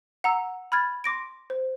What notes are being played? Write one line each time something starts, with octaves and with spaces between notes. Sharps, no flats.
F#5 A#5 E6
B5 F6 G#6 A6
C6 D6 A#6 D7
C5